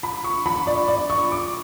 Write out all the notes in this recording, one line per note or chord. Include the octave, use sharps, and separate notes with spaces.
B5
C#6
B5
D5
D5
C#6
D6